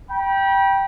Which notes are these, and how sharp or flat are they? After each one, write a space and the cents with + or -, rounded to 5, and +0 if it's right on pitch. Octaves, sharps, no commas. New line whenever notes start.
G5 +0 B5 -40